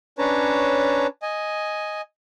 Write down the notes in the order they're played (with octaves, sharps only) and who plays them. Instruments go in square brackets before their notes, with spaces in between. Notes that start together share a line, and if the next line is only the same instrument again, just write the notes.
[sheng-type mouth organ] C#4 D4 B4 C#5 A5 A#5
D#5 G#5